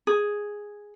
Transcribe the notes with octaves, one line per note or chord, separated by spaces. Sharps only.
G#4